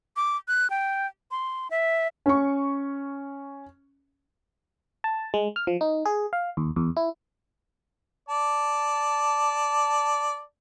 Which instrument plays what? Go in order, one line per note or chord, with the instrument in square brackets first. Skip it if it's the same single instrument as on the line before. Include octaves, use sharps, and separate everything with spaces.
[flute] D6
F#6
G5
C6
E5
[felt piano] C#4 C#6
[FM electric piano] A5
G#3
F6
F3
D#4
G#4
F5
D#2
E2
E4
[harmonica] D5 A5